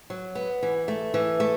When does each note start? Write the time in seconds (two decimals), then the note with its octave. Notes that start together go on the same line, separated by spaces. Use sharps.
0.10 F#3
0.35 B3
0.63 E3
0.88 A3
1.14 E3
1.40 A3